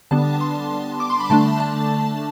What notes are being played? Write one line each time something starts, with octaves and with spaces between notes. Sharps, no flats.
D3 G3 B3 D4 A5
C6
D6
C6
B5
D3 A3 D4 A5
A5